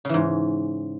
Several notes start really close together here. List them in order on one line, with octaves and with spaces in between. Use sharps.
C#3 E3 G#2